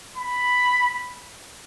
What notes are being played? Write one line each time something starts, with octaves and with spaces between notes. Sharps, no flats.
B5